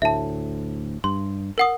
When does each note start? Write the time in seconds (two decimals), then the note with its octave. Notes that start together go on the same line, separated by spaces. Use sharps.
0.02 D2 A2 E5 A5
1.04 G2 C6
1.58 A#4 F#5 D#6